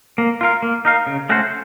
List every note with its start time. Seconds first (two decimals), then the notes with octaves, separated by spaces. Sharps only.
0.18 A#3
0.41 F4 A#4 F5
0.63 A#3
0.85 D#4 A#4 F5
1.07 C#3
1.29 A3 C#4 F#4 C5